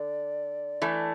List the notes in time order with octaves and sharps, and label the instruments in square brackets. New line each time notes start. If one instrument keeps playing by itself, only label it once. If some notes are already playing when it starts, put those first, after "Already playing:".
Already playing: [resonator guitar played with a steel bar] D3 [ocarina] D5
[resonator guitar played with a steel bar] E3 A3